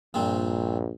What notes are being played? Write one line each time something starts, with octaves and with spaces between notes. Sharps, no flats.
A#1 G2 A#2 C4